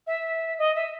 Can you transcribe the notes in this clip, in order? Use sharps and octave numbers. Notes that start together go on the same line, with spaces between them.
E5
D#5
E5